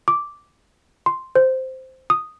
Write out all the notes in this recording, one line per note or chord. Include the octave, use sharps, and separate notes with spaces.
D6
C6
C5
D#6